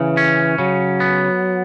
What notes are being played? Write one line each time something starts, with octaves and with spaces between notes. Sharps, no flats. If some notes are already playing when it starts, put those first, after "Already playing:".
Already playing: C#3 E3
C#4
C#3 F#3
B3